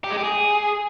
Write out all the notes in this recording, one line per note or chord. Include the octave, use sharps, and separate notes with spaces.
G4
G#3
G4
G#4